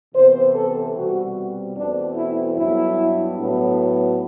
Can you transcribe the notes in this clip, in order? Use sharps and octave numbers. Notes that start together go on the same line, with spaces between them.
C3 E3 B3 C5
A4
B2 G3 C4 F#4
E2 B2 A3 C4 D4
E4
G2 F#3 B3 E4
A2 F#3 B3